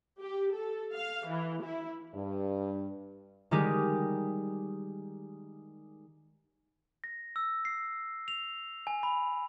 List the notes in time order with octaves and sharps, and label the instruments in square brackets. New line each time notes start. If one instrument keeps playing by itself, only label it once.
[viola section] G4
A4
F5
E3
E4
[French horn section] G2
[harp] D#3 G3 G#3 D#4 G4 G#4
[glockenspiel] A#6
E6
C7
F7
G#5
B5